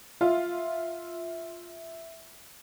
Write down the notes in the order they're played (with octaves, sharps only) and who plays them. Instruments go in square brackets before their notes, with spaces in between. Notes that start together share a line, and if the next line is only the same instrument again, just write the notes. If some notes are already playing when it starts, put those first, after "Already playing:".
[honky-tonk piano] F4 [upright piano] E5